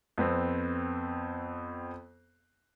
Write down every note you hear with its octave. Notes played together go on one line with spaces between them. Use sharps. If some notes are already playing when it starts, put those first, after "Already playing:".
F2 B3 C4